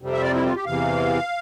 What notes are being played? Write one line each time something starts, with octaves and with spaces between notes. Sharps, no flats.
F2 C3 G3 C4
E5
D5
E4
F4
G4
E2 C3 E3 F5